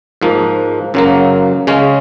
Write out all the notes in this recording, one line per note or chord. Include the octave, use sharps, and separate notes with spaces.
G#2 F3 A#3
F#2 C#3 F#3 A#3
C#3 G#3 C#4